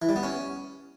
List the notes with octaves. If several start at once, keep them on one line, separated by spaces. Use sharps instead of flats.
E3
G3
B3
C#4